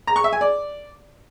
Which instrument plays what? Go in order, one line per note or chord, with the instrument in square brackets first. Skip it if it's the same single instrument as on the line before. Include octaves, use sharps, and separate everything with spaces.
[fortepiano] A#5
C#6
E5
G#5
D5